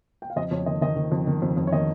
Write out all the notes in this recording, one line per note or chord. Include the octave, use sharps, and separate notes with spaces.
G5
F5
F2 D#5
F2 C#5
D#3 D#5
D#3 D#5
D#3
F2
D#3
F2
F2
C#5
D#3 D#5